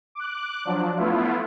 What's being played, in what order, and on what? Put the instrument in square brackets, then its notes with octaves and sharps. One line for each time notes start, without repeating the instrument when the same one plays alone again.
[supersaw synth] D6 F#6
F3 F#3 D4
A3 B3 E4 F4